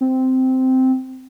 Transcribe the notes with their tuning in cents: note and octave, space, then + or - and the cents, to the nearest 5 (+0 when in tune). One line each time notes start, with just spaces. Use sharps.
C4 -10